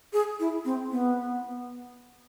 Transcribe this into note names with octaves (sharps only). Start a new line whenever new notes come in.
G#4
E4
C4
B3